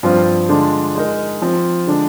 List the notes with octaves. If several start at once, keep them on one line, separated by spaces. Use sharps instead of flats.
G2 F3 C4 F4
D3 G#3 D4 F4
G#3 D#4 A#4
F3 C4 F4
D3 G#3 D4